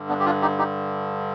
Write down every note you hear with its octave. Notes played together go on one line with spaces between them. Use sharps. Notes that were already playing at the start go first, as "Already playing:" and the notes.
Already playing: G2 D3
B3 D4
G4
D4 F4
D#4 G4
D#4 G4